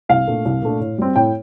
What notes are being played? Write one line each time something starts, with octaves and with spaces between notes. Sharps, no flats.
C2 F5
A#2 A3 D4
C2
A#2 A3 D4
A2
G3 C4
A2 G5